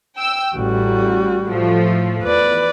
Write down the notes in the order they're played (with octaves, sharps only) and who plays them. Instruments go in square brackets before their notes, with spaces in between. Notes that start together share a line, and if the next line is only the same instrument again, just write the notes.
[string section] G5 E6
[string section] A1 [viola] G3 F#4
[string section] A2 F3 A3
[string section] E2 [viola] B4 D5